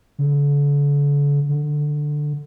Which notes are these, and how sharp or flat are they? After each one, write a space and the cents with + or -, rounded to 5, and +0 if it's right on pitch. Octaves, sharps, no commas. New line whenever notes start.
D3 -40
D3 +10